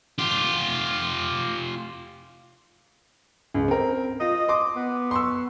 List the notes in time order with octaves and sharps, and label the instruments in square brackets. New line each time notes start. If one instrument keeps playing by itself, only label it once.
[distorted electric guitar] F4 G4
[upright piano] C#2
C4 A#4
[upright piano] F4 [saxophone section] D#5
[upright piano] C6 D6
[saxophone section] B3
[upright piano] C6 C#6 E6